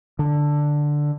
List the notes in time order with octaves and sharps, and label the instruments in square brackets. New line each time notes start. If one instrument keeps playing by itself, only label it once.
[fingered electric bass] D3